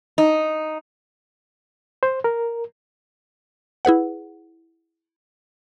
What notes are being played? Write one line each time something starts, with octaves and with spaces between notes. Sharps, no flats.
D#4
C5
A#4
E4 G#4 B4 F#5